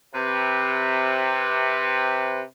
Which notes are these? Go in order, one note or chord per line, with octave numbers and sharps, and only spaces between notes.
C3 B4